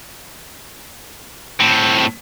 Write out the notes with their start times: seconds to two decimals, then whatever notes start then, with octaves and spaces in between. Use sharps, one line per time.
1.60 A2 C4